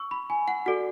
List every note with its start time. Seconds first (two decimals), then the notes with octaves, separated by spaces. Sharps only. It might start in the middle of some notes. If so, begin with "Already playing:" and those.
Already playing: C#6 E6
0.11 B5
0.30 G#5
0.48 F#5
0.66 F#4 A4 D5 F#5